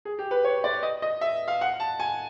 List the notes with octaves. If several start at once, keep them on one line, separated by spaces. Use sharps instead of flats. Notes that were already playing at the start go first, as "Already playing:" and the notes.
G#4
G4
B4
C#5
D5
D#5
D#5
E5
F5
F#5
A5
G#5